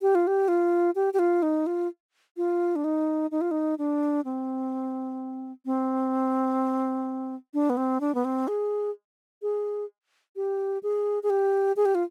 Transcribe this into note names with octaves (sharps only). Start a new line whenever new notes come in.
G4
F4
G4
F4
G4
G4
F4
D#4
F4
F4
D4
D#4
D#4
F4
D#4
D4
C4
C4
D4
B3
C4
D4
B3
C4
G#4
G#4
G4
G#4
G#4
G4
G#4
G4
F4